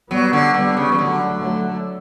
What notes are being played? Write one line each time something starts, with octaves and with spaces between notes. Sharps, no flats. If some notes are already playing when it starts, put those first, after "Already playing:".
F#3 G3 B3
D3
D3 G3 B3
C#3
E3
D3 F#3 A3
F#3 A3